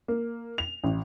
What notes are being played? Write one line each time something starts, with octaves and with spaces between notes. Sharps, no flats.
A#3
F7
A1